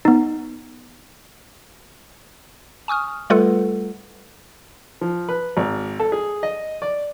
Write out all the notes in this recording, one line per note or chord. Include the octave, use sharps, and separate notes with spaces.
B3 D#4
G#5 C#6 D#6 F6
G3 A3 F4 A4 B4 F#5
F3
B4
G#1
A4
G#4
D#5
D5